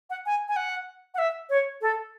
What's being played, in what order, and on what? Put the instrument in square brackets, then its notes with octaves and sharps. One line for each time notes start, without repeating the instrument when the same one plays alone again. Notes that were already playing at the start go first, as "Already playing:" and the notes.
[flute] F#5
G#5
G#5
F#5
F#5
E5
C#5
A4